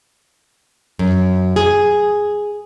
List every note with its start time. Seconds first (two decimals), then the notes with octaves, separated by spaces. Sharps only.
0.99 F#2
1.56 G#4